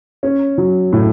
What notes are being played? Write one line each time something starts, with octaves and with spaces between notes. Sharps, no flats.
C#4
F#3
A2